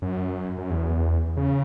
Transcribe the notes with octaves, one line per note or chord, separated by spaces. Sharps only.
F#2
F#2
E2
C#3